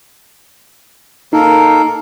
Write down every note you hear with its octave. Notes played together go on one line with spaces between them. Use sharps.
A#3 D#4 A4 A#4